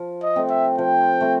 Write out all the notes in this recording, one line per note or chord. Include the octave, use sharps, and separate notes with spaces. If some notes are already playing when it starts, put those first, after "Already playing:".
Already playing: F3
D#5
A3 C4
E5
F3 G5
A3 C4